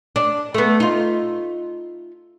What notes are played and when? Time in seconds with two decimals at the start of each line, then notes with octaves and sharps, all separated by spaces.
0.16 D4
0.54 A3 B3
0.80 D#4 F4